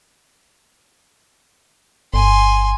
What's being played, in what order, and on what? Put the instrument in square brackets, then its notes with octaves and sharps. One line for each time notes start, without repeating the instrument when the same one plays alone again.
[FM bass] G1 [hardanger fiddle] G#5 C6